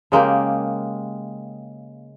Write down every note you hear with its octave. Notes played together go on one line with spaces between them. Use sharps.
C#3 G#3 A#3 G4